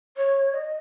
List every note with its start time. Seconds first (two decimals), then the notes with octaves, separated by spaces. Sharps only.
0.17 C#5
0.54 D#5